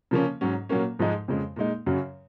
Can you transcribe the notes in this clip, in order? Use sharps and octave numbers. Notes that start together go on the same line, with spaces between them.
C#3 F3 A#3 C#4
G#2 F#3 C#4
A#2 F#3 A#3 C#4
G#2 F3 G#3 D#4
F2 C#3 G#3
A#2 G#3 D#4
F#2 C#3 F#3 C#4